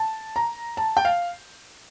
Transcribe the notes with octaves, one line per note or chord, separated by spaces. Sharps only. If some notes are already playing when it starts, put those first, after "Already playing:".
Already playing: A5
A#5
A5
G5
F5